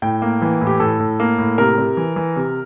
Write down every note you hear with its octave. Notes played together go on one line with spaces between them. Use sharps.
A2 G5
A#3
E3
A2
G4
A2 A4
A2
A#3
A2
C3 A#4
C3
E3
E3
C3